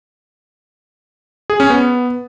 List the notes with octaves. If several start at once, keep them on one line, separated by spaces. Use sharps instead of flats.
G#4
C#4
B3